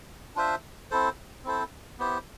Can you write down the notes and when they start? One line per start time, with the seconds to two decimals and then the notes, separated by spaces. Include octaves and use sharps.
0.36 D4 F4 C5 E5
0.91 C4 E4 A4 C5
1.44 C4 E4 A4 C5
1.99 B3 E4 G4 C5